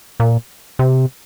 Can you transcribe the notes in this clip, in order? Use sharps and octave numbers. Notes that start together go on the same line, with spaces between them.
A#2
C3